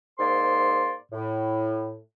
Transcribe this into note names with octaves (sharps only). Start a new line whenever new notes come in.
G#2 A#3 C5 D5 C6
A2